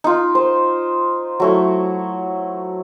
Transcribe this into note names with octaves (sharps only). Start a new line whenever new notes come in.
D#4 F4
C5
F#3 A3 E4